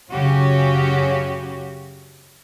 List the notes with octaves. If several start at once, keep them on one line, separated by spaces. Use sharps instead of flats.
F#2 C#3 C#4 F#4 G4